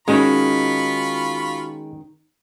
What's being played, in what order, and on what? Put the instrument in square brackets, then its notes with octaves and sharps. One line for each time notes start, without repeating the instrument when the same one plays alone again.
[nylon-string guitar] D#3 C#4 [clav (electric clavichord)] G#3 D#4 [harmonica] F4 B5 C#6 [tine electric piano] F#4